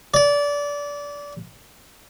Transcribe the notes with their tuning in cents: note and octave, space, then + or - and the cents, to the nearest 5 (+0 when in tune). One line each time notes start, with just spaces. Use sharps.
D5 -25